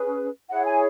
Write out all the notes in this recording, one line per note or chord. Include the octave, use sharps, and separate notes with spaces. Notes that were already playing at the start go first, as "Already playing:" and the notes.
Already playing: C#4 G#4 B4
E4 G#4 C#5 F#5
G#5